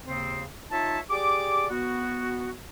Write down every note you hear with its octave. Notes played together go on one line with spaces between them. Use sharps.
D#2 C#3 C4
D#4 F4 C#5 E5 A5
G4 G#4 D5 D6
B3 F#4